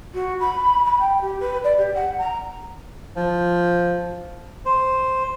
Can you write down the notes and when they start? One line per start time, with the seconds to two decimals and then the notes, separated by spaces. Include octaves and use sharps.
0.14 F#4
0.40 B5
0.85 B5
0.99 G5
1.21 G4
1.40 B4
1.64 D5
1.77 G4
1.94 F#5
2.18 A#5
3.16 F3
4.65 C5